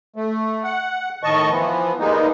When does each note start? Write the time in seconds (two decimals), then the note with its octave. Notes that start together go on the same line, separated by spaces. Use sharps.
0.16 A3
0.64 F#5
1.23 A2 D#3 D#5 A5 C#6
1.50 E3 F3 B3
1.99 G3 G#3 A#3 B3 D#4